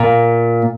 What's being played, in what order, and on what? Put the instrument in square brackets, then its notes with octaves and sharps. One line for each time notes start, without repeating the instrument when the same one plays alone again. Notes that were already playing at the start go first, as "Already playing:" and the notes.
Already playing: [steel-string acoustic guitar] A#2